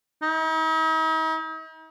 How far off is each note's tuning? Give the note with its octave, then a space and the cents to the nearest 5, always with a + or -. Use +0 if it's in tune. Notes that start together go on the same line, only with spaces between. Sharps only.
D#4 +45